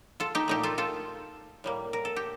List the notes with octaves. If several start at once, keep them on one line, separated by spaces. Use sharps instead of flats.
F4 A4
D#4 G4
A#2 A3 D#4 G4
F4 A4
F4 A4
A2 G3 A#3
A#4
A4
G4